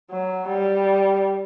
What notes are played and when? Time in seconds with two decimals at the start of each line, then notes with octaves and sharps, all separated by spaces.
0.10 F#3
0.48 G3